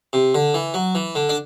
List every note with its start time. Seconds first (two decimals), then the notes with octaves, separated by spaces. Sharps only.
0.13 C3
0.35 D3
0.54 E3
0.74 F#3
0.95 E3
1.15 D3
1.29 D4